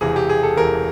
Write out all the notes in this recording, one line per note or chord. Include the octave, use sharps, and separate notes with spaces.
E1 E2 C3 G#4
G4
G#4
A4
E1 E2 C3 A#4